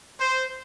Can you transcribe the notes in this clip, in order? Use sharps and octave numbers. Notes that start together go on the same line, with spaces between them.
C5